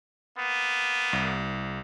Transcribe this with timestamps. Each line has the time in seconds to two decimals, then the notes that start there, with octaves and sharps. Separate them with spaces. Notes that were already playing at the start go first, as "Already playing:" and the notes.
0.38 A#3 B3
1.13 C2